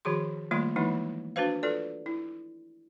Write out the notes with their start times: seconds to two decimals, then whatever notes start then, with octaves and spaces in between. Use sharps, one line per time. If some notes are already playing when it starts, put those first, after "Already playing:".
0.05 D#3 F3 F#4 G#4 C6
0.51 D#3 G3 A3 A#3 F4 C6
0.76 E3 F3 G#3 A#3 D#4 E4
1.36 D4 F#4 B4 C5 F5
1.63 F4 A4 B4 D5
2.06 E4